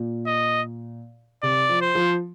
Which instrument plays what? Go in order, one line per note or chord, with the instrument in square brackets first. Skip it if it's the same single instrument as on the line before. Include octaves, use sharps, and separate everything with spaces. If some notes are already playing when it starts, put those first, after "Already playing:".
Already playing: [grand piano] A#2
[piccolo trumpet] D#5
[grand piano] C3 [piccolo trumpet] D5
[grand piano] F3
[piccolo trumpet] C5
[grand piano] F3